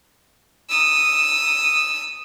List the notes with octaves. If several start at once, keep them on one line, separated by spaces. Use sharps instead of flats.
D#6 E6